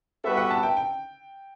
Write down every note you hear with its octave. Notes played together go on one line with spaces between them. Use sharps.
G3 B3 F#4 A4 B4 E5
F#5
A5
G5
G5